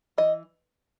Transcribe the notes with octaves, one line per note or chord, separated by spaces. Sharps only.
E3 D#5